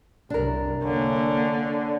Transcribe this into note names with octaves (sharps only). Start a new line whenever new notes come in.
C2 F#2 D4 A#4
D3 A#3 C#4